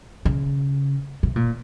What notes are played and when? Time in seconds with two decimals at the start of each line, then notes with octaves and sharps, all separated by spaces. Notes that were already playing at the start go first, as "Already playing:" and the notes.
0.25 C#3
1.23 C3
1.36 A#2